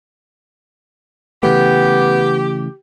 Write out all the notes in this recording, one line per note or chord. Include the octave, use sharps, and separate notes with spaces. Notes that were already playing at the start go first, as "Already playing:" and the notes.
C#3 E3 A3 B3 G4